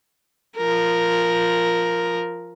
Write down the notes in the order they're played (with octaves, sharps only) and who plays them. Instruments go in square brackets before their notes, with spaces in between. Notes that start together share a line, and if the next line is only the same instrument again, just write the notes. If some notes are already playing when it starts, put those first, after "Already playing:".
[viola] F3 A#4